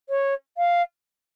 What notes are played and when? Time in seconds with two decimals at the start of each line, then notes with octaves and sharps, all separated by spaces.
0.09 C#5
0.57 F5